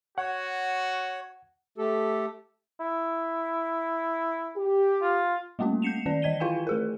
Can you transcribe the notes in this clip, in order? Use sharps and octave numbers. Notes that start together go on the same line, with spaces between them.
F#4 C#5 F#5
A3 G4 A4
E4
G4
F4
G3 A3 A#3 C#4 F#4
G6 C7 C#7 E7 F7
D#3 C#4 D5
E3 D#5 G#6 D#7 G7
E4 F4 B4 F5 G5 G#5
A3 G#4 A#4